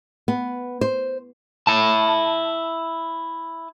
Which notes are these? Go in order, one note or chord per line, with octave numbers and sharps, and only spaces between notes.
B3
C5
E4 A5